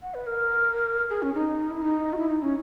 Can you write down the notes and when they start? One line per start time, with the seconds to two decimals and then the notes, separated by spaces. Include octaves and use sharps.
0.02 F#5
0.14 B4
0.27 A#4
1.10 G#4
1.22 C#4
1.34 D#4
1.70 E4
1.82 D#4
2.13 F#4
2.18 E4
2.29 D#4
2.42 C#4